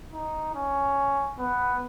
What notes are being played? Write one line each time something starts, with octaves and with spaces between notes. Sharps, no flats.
D#4
C#4
B3